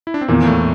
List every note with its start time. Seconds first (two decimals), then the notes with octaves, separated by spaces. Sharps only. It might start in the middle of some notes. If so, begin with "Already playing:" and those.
0.07 E4
0.14 D4
0.21 C4
0.28 E2 A#2 A#3
0.46 A2 A3